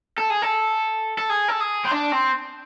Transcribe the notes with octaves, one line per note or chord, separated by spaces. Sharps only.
A4
G#4
A4
A4
G#4
A4
G#4
C4
D4
C4